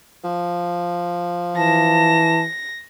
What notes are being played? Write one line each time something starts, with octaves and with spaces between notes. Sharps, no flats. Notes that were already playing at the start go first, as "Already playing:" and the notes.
F3
E3 A5 A#6